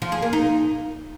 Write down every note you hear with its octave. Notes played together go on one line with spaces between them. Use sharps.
F3
G#4
A#3
D#4